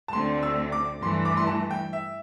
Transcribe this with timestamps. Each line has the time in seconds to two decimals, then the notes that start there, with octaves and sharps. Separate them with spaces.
0.08 A5
0.13 D2 D3 A3 C4 C6
0.43 E6
0.72 D6
1.02 G2 E3 A3 C6
1.25 D6
1.37 C6
1.47 A5
1.71 G5
1.93 E5